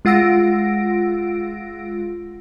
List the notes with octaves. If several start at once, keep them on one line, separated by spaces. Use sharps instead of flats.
G#3 F4 F#5 E6 A#6 D7